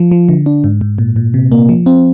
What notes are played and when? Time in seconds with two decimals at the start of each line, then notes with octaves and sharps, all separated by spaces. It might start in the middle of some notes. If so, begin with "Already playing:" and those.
Already playing: F3
0.11 F3
0.29 D3
0.46 D4
0.64 G#2
0.81 G#2
0.98 A#2
1.16 A#2
1.34 C3
1.52 A#3
1.69 F3
1.86 C4